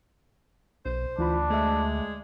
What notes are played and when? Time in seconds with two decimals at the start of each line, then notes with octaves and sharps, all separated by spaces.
0.85 B1 C5
1.19 D2 E3 D4 F4 B5
1.50 G#3 A3 E5